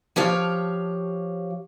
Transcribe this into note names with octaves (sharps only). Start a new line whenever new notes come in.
F3 G4 C#5 F5